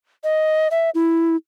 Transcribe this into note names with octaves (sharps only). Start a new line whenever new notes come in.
D#5
E5
E4